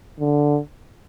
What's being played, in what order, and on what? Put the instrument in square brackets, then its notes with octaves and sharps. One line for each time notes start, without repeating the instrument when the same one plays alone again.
[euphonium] D3